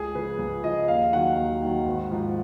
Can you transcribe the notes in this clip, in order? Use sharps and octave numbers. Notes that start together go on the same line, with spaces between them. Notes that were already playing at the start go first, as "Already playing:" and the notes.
Already playing: C#2 G#4
C#3 F3 B4
C#2
C#3 F3 D#5
D#2 F5
D#3 F#3 F#5
D#2
D#3 F#3
G#1
G#2 F3